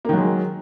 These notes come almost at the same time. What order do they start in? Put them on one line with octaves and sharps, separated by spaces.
A#3 D#3 F#3 G#3